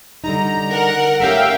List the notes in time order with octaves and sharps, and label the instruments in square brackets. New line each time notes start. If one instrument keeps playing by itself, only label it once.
[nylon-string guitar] D3 G3 D#4 [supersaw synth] A#5
[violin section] A#4 F#5
[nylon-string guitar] A3 C#4 G4 [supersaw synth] E5 F5 G5